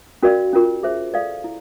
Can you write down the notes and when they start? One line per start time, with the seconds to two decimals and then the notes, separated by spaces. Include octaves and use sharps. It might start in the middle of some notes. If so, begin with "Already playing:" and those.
0.23 C#4 F#4 A#4 D5 F5
0.53 C#4 F4 A#4
0.83 G#4 C5 E5
1.14 A4 D5 F5
1.44 E4